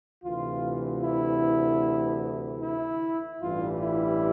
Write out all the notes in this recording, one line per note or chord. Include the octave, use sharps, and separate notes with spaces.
D2 C3 E3 F4
E4
E4
A1 G2 E3 G3 F4
E4